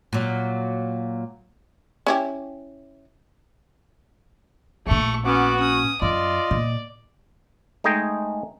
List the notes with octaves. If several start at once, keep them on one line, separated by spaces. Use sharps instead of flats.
A#2 F#3
C#4 E4 G4
A#1 A#2 A3 C#6
B3 C#4 F#4 D6
C#4 D#6
F#2 F4 D5 D#5
A#2
G#3 A3 D#4 G#4 D#5 G5